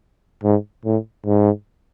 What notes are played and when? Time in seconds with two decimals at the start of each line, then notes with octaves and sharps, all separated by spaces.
0.43 G#2
0.85 A2
1.26 G#2